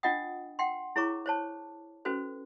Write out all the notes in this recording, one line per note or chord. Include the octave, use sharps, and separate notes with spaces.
D4 F4 D#5 F#5 G5 D#6
F#5 G5 C6
E4 G#4 C#5 A#5 C#6 D6
C5 C#5 A5
C#4 F#4 A4 B4 C5